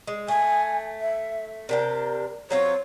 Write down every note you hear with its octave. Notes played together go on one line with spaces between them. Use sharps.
G#3
A3 G#5
E5
C3 D4 A#4 G5
F#3 C4 F4 C#5